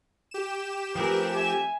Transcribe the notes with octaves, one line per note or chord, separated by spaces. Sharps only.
G4 E7
F3 A3 C4 G#4 A#4 B4
E5 G#5